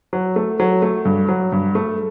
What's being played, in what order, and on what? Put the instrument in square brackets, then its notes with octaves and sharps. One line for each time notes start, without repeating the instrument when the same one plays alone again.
[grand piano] F#3
A3
F#3
A3
G2
F#3
G2
A3